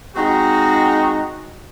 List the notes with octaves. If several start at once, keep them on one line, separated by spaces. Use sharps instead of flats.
G#3 C4 D#4 F#4